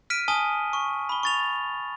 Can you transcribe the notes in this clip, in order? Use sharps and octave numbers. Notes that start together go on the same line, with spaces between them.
F6 B6 D7 D#7
G#5 A5 D#6 D#7 G7
C#6
B5 G7
C#6 A6 F7